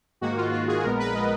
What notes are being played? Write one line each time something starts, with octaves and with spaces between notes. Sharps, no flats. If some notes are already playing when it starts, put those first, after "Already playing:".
G#2 D#3 A#3 F#4
F4
F4
G#4
A#1 A#2 G#3 B3 A#4
B4
D#5